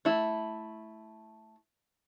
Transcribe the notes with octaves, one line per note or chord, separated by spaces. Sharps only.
A3 E4